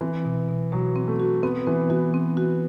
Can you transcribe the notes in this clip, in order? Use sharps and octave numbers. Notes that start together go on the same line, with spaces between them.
E3 C4
B2
B2
B2 F#3
C4
A3
F#4
B3 C4
E3 C4
E3 F#4
C4
F#4